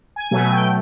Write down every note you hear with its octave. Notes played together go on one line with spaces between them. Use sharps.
G#5
B2 F#3 A3 G#5
G5